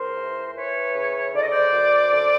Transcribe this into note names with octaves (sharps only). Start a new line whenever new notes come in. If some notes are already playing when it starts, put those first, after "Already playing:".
Already playing: C#2 A#4 C5
E3
E3 B4 C#5
C#3
D3 D5
D#5
C5 D5
F#2
D3